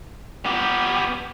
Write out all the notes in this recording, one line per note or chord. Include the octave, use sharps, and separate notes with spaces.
B3 G4